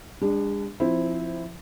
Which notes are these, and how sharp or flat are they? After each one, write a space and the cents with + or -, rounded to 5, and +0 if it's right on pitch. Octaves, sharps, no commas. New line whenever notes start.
G#3 -40 D4 +0
F3 -10 C4 +0 E4 +0